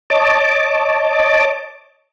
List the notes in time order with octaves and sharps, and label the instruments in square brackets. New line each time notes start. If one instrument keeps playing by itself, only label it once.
[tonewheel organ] C#5 D#5 A5 D6